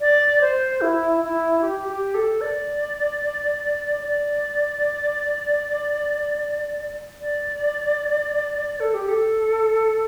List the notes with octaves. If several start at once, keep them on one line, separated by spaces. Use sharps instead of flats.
D5
C5
E4
E4
G4
G4
A4
D5
D5
D5
A4
G4
A4